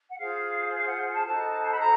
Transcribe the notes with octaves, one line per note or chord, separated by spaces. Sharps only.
F#5
F4 G#4 C5 F5
F5
F#5
A5
D#4 F#4 A4 C5 A5
B5
A#5